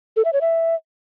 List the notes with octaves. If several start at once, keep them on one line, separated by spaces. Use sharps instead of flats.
A4
E5
C#5
E5